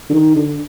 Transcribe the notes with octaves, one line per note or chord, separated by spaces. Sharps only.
D3
D#3
D3